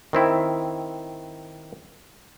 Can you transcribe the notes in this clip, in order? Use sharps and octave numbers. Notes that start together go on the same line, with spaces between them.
D#3 C4 E4